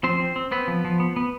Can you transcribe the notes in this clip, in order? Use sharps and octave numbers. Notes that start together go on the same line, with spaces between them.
F3 C4 C5
C4
C4
B3 C4 B4
F3
F3
B3
B3